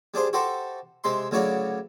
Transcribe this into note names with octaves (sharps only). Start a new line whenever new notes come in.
G3 D4 G#4 C5 F5
F#4 G4 A4 C5 E5
C3 G#3 E5 C6
D2 C#3 F#3 E4 C#5 D5